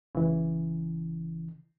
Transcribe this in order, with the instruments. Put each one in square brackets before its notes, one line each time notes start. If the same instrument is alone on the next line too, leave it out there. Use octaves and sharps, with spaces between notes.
[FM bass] F1 [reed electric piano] C#3 E3